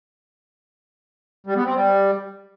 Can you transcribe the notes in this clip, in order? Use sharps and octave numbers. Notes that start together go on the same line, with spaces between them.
G3
B3
C4
G3